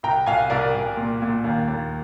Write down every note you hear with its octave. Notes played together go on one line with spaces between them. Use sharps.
C2 G5 A#5
C2 F5 G#5
C2 A#4 D5
C2
A#2
A#2
D#2
D#2